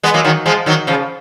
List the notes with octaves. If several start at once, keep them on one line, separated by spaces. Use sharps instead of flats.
G#3 B3
F#3 A#3
D#3 F#3
F3 G#3
D#3 F#3
C#3 F3